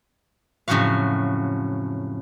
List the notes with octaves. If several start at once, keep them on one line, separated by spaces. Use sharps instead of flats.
F2 A2 C#3 F#3 F#4 F5